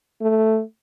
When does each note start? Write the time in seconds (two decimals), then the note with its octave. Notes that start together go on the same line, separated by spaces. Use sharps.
0.21 A3